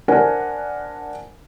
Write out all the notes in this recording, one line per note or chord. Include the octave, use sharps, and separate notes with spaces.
D4 A#4 C5 F#5 G#5